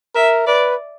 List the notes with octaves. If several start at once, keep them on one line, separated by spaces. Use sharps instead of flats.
A#4 E5
B4 D5